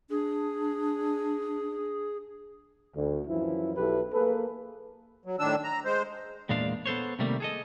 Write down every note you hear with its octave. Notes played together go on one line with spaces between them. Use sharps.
D4 G#4
D2
F#2 E3 F3 E4
B1 E4 G4 A4 B4
A#3 G#4 A4 B4
F#3
A2 D#3 D4 E6
A#5
G#3 C5
E2 A#2 G#3 D4 F5
B3 A4 C5 C#5
C3 D#3 G3 A3 A#3
G#4 A4 D#5